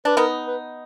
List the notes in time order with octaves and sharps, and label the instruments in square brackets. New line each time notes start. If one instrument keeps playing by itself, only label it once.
[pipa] D4 [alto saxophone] B4
[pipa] B3 D#4 [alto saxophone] A#4
[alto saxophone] B4